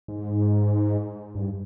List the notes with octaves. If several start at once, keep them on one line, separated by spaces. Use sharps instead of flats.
G#2
G2